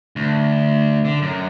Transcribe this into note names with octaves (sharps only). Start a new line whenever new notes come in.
D2
D3
F#2